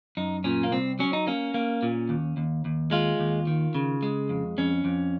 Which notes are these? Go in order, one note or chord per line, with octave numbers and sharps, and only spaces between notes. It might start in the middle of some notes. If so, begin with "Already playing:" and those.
F#2 D#4
A#2 C#4
A#3
C2 C4
F#3 C#4
D#4
A#3 C#4
A#3
A#2
D#2
D#2
D#2
G#3 F4
D#2
D#3
C#3
G#3
F2
F2 C#4
F2